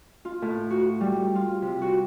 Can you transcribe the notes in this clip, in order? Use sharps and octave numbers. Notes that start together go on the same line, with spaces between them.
F4
A2
F#4
G3
F4
C3
F#4